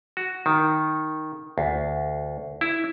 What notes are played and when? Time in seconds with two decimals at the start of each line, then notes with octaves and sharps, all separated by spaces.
0.17 F#4
0.46 D#3
1.58 D2
2.61 E4